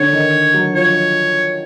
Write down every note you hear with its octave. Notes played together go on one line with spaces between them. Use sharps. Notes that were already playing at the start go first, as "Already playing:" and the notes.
Already playing: D3 C#5
D#3
F#3
F3 C#5